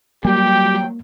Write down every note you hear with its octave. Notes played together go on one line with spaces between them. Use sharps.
F#3 G3 A#3 G4 G5